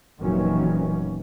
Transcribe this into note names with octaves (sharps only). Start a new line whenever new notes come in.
F1 A#2 D#3 E3 F#3 C#4